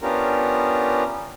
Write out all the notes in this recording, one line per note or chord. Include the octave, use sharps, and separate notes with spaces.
B3 C#4 D4 F4 G4 A#4